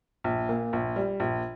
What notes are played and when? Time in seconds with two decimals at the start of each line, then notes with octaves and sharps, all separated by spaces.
0.24 A#1
0.49 A#2
0.73 A#1
0.96 G3
1.20 A#1